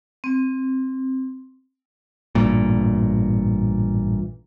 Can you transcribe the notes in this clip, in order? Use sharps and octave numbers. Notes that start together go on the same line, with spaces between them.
C4
A1 G2 A#2